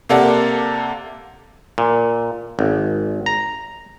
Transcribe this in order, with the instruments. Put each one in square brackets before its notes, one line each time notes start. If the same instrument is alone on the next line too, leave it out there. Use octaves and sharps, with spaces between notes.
[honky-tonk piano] C3 A#3 A4 D5 F#5
[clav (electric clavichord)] A#2
G#1
A#5